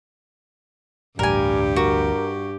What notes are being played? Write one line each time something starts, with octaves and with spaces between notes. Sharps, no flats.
D1 A1 D2 G2 G3 G4 A#4 G#5
F#4 A#4